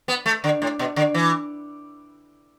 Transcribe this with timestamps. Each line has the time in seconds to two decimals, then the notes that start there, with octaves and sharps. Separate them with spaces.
0.08 B3
0.26 A3
0.44 D3
0.62 A2
0.79 B2
0.96 D3
1.14 E3